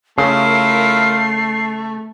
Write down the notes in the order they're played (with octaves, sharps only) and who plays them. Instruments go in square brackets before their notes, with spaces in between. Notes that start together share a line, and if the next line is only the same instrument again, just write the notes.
[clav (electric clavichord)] C#3 [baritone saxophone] A3 [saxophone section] E4 F4 A#4 [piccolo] C7